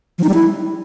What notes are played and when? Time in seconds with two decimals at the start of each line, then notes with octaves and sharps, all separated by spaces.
0.18 F3
0.24 D#4
0.29 G3
0.34 E4